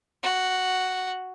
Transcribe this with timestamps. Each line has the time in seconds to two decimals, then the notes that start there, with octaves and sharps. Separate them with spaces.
0.23 F#4